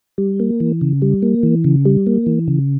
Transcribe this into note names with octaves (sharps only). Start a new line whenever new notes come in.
G3
A#3
E3
C#3
G3
A#3
E3
C#3
G3
A#3
E3
C#3